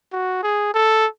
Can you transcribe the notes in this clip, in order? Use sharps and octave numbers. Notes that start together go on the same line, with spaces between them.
F#4
G#4
A4